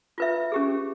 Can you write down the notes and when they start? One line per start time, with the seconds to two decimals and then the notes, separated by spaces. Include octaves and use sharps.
0.18 F4 B4 E5
0.52 C#4 G4 G#4